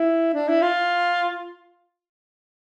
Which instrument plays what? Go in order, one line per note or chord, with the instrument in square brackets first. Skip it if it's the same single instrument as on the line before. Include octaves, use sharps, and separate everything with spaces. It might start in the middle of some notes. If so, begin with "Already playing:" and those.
Already playing: [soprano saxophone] E4
D4
E4
F4